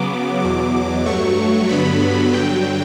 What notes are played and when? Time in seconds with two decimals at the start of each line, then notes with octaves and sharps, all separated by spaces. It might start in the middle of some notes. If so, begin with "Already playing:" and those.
Already playing: C#3 F#3 B3 D6
0.42 E2 B2 F#3 D6
1.06 G2 F#3 A3 C#6
1.69 G2 D3 F#3 B3 B5
2.33 G2 D3 F#3 G5